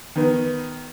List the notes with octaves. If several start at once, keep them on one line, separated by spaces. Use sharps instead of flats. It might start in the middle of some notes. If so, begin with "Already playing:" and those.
D#3 B3 B4